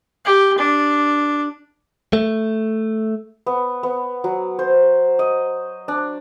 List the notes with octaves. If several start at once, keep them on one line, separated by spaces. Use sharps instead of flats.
G4
D4
A3
B3
B3
F#3
C5
D#5
D4